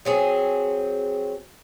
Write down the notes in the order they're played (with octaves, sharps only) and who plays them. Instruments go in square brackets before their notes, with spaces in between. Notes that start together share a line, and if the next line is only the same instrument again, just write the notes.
[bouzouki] F#3 C4 G#4